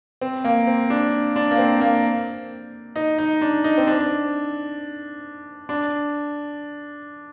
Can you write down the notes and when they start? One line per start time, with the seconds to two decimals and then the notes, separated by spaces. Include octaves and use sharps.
0.21 C4
0.44 A#3
0.67 C4
0.90 D4
1.36 D4
1.51 A#3
1.58 C4
1.81 A#3
2.96 D#4
3.19 D#4
3.41 D4
3.64 D#4
3.77 C4
3.87 D4
5.69 D4